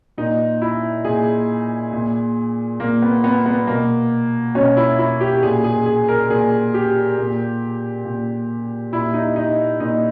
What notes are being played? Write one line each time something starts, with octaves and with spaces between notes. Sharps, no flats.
A#2 D#4
E4
A#2 G#4
A#2
A#2 A#3
B3
B3
B3
B2 A#3
B2 C#4
E4
E4
G4
A#2 G#4
G#4
G#4
A#4
A#2 G#4
G4
A#2
A#2
A#2 E4
D#4
D#4
A#2 D#4